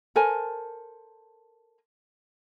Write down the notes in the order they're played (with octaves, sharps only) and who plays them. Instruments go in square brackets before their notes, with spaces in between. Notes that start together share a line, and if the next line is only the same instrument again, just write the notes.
[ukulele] A4 A#4 C5 G#5